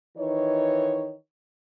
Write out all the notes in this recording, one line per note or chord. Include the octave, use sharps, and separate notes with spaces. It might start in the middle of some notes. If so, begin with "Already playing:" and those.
D#3 E3 D#4 C#5